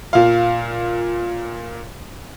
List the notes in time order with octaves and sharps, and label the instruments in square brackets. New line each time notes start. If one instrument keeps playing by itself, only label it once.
[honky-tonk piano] A#2 F5